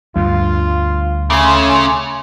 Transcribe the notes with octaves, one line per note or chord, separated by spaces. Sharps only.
D2 G2 F4
C#3 A3 G#5 C6 D6